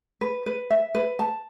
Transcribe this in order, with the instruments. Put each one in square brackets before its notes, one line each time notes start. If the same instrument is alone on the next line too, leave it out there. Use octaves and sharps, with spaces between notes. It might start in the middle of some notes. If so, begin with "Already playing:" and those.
[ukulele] B4
B4
E5
B4
A5